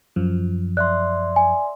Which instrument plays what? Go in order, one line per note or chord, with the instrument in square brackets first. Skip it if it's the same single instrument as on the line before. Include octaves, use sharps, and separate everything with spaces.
[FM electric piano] F#2 F3
[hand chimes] D5 E5 C6 [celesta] F#6
[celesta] G#5